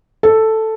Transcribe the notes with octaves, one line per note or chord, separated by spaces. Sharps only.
A4